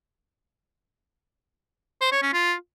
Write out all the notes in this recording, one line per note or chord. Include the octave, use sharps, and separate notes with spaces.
C5
C#5
C#4
F4